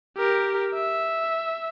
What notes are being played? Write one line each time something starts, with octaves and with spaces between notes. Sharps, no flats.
G4 A#4
E5